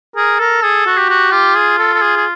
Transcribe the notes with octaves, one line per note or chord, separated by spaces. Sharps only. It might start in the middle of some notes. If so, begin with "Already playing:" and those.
G#4 A#4
A4 A#4
G#4 A4
F#4
G4
F#4
F4 G4
G#4
A4
A4
G#4
G#4